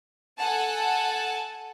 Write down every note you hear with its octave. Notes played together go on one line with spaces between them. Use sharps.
A4 F#5 G#5 A5